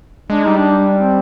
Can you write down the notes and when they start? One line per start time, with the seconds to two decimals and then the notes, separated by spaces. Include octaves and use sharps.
0.30 G#3 D4
0.44 G3 D#4
0.58 D4
0.97 C4